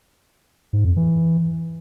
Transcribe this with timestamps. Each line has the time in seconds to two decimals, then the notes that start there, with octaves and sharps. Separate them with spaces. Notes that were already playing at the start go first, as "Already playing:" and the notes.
0.73 G#2
0.85 F2
0.96 E3